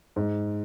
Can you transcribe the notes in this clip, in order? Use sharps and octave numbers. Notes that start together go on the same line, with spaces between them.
G#2